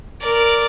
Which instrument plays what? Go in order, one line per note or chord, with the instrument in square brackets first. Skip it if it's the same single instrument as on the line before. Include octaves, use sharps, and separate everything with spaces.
[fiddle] A#4 [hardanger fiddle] D5